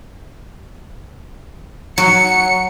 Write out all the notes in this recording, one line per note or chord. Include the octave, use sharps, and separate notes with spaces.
F#3 C#7